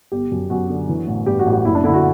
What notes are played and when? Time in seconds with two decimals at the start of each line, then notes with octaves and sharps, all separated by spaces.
0.12 G1 G4
0.31 F#2
0.50 F#2 F#4
0.70 D3
0.89 E3
1.07 A1
1.26 G2 G4
1.39 F#4
1.46 A1
1.53 G4
1.65 F#1 E4
1.75 D4
1.84 D3 E4
1.94 F#4